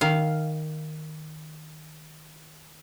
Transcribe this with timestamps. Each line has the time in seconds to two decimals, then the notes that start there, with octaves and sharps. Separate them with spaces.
0.01 D#3 F5